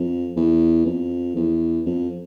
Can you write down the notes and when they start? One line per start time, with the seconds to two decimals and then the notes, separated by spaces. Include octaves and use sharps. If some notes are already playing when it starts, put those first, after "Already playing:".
Already playing: F2
0.36 E2
0.86 F2
1.36 E2
1.86 F2